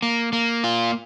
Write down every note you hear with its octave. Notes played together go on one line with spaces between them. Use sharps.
A#3
A#3
F4